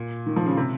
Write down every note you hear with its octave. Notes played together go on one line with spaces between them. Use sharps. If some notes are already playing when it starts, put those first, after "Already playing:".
Already playing: A#2
D#3
F3
C#3
C3